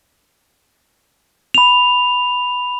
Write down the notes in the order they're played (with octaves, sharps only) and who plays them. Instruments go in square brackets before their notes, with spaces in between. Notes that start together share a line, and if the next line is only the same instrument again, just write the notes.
[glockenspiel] B5 F7